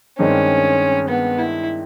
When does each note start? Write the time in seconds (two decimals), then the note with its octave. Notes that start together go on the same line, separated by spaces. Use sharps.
0.19 G2 D#3 G#3 C4 C#4
1.09 B3
1.39 E4